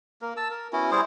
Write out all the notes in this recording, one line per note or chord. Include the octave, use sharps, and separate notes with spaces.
A#3 A#4
A5 E6
A#4
B3 C#4 E4 F#4
G3 E4 G#4 C5